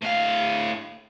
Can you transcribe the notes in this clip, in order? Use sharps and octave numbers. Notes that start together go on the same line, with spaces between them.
A2 F5